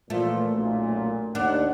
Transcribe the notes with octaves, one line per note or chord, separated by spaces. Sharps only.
A#2 E3 F3 A3
B1 F#2 A#2
D#2 D4 A#4 D5 F#5